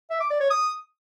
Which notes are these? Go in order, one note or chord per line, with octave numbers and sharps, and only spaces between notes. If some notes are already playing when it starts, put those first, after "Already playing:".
E5
D6
D5
C#5
D#6